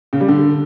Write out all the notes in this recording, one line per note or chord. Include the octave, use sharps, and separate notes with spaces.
C#3
G3
D3